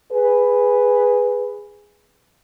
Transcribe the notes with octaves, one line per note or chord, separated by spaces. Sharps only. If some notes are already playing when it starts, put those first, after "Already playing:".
G#4 B4